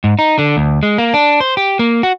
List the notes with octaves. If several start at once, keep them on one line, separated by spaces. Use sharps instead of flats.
G#2
D#4
D3
D2
G#3
A#3
D4
C5
G4
A#3
F#4